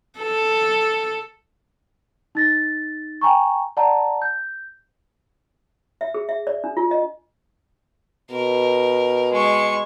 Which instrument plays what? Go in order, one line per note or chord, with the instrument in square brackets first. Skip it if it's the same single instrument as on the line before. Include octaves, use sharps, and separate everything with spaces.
[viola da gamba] A4
[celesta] D#4 A6 A#6
G5 G#5 A#5 C#6
D5 F#5 A5 A#5
G6
[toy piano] E5
G#4
E5
D5
D4
F4
D#5
[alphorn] B2 [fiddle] A#4
[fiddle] G#3 C#6